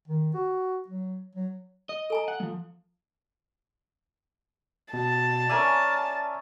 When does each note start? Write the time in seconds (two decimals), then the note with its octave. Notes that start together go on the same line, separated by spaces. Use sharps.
0.08 D#3
0.34 F#4
0.88 F#3
1.35 F#3
1.89 D#5
2.10 A4 G#5 A#5
2.28 F#5
2.40 F3 G#3
4.93 B2 A5
5.49 C#4 A#4 D5 E5 G#5